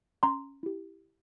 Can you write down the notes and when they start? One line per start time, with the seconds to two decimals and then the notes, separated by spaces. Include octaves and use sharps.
0.23 C#4 A#5 C6
0.63 E4 G4